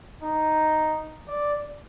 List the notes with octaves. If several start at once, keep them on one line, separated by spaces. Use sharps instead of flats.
D#4
D5